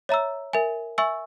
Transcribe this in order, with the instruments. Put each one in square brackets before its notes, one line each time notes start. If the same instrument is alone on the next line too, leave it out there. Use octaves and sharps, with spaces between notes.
[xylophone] C#5 E5 A#5 E6
A#4 E5 G#5
E5 G#5 C#6 E6